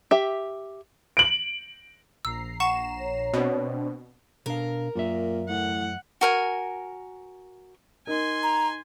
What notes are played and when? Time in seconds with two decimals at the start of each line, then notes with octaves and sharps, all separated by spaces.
0.11 G4 E5
1.17 D7 F#7
2.25 A#1 A#5 E6 C7
2.60 F#5 C#6 E7
3.00 C#5
3.33 B2 C4 D4
4.46 B2 D4 A#4 F5
4.96 F#2 A#2 E5
5.49 A2 F#5
6.21 F#4 A#4 G#5
8.07 D#4 A#4 G#5 C6
8.43 A#5